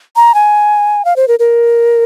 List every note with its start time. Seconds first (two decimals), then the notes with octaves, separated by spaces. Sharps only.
0.16 A#5
0.34 G#5
1.05 F5
1.16 C5
1.28 A#4
1.39 A#4